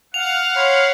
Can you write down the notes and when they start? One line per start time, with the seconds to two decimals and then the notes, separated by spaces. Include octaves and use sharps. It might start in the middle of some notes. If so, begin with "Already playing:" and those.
0.14 F5 F#5 F7
0.56 C#5 B5 C6